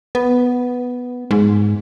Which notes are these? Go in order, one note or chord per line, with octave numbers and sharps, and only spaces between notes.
B3
G#2